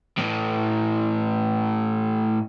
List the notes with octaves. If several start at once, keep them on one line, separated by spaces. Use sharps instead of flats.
A2 E3